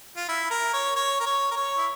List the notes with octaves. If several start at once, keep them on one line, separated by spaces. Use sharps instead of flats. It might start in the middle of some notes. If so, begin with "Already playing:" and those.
F4
E4
A#4
C#5
C#5
A#4
C#5
A#4
C#5
E4